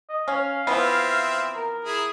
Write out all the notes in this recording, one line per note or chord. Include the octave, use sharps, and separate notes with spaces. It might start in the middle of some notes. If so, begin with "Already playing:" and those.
D#5
C#4 F5
E3 F3 B3 C4 E5
A#4
E4 G#4